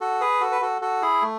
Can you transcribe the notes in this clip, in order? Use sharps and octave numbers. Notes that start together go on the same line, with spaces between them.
F#4 A4
G#4 B4
F#4 A4
B4
F#4 A4
F#4 A4
E4 G#4
A3